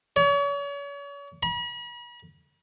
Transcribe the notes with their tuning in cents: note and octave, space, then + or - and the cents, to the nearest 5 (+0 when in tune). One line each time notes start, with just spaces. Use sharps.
C#5 +40
B5 -45